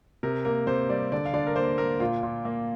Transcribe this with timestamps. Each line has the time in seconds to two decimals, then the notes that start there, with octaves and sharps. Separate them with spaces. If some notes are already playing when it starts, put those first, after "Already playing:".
0.23 C3 A#4
0.45 A#3 A#4
0.67 C3 C5
0.89 G3 D5
1.12 D3 D5
1.25 F5
1.34 D3 D5
1.47 A#4
1.56 A#3 C5
1.78 A#3 A#4
2.00 A#2 F4
2.23 A#2
2.45 A#3